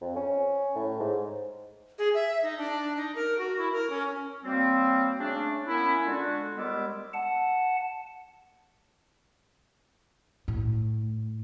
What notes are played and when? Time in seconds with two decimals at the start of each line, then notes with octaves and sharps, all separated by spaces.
0.02 F2
0.16 C#4
0.76 A2
1.00 G#2
1.98 G#4
2.14 E5
2.43 D#4
2.58 D4
2.97 D#4
3.16 A#4
3.39 F#4
3.58 E4
3.73 A#4
3.90 C#4
4.44 F#3 G3 A#3 C4
5.19 C#3 A3 C#4 D4
5.68 A#3 B3 C#4 E4
6.06 D3 G#3 D4 F4 F#4
6.56 D#2 G3 G#3 B3 D6 E6
7.14 F#5 A5
10.48 A2